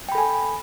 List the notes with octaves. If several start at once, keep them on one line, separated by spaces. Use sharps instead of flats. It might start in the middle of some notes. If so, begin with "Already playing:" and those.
A4 G5 G#5 B5